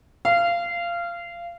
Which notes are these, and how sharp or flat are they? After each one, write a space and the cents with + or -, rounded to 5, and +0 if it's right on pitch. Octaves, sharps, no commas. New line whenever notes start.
F5 -20